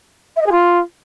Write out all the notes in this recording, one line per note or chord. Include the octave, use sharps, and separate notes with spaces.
E5
D#5
G#4
F4